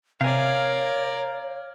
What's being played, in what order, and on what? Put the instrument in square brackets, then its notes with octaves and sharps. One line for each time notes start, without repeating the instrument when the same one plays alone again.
[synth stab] C3 [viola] A#4 D5 [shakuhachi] C#5 [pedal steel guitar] F5 G#5